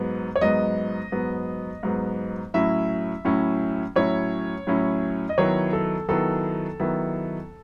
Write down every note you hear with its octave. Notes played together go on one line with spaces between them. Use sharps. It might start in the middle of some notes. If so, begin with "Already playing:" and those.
Already playing: G#2 F#3 B3
C#5
G#2 F#3 B3 D#5
G#2 F#3 B3
G#2 F#3 B3
A2 F#3 C#4 E4 E5
A2 F#3 C#4 E4
A2 F#3 C#4 E4 C#5
A2 F#3 C#4 E4
D#5
D#3 F#3 B3 E4 C#5
A4
D#3 F#3 B3 E4 A4
D#3 F#3 B3 E4